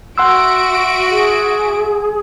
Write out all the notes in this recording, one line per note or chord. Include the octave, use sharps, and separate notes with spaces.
F#4 E5 F#5 C6 E6 D7
G#4